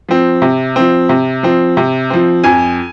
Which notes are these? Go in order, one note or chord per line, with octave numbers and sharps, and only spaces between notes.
F3 C4
C3
F3 C4
C3
F3 C4
C3
F3 C4
F2 G#5